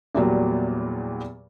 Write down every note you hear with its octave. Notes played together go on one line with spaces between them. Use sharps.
E2 A#2 F#3 G3